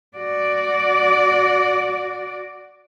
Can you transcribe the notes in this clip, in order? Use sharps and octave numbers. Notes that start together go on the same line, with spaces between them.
F#4 D5